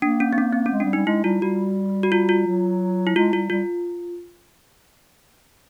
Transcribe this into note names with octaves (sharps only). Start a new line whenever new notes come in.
A#3 D4
C#4
C4
C#4
C4
C#4
G#3
G3 D4
G3 D#4
G#3 E4
G3 F4
G3 F#4
F#4
F4
F4
F#3
E4
G#3 F4
G3 F4
G3 F4